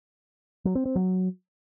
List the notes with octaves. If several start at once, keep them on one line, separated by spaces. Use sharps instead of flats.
F#3
C4
C4
F#3